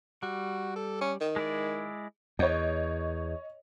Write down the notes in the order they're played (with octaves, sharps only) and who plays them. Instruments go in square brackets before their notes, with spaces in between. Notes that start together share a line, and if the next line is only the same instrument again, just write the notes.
[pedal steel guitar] G3 [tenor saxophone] F#4
[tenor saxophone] A4
C#4
D#3
[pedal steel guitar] G#3 E4 D5
[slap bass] E2 [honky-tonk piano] C#5 D#5